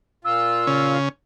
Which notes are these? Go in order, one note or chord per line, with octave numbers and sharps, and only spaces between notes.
A#2 F4 E6
C#3 C#4